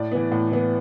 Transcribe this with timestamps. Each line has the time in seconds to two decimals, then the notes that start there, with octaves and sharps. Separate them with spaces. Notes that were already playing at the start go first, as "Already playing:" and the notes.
Already playing: A2 D5
0.12 E3 B3
0.32 A2
0.52 E3 B3